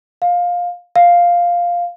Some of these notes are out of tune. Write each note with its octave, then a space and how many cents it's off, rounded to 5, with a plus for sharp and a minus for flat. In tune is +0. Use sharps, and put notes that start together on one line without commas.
F5 +15
F5 +0